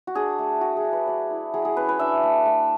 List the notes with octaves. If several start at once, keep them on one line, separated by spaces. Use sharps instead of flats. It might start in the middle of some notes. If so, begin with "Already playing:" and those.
F#4
D4 G#4
A3
A3 F#4
G#4
D4
B4
F#3 D5
E4
F#3 G#4
G#4
C#4 B4
B4
D4 E5
A3
A3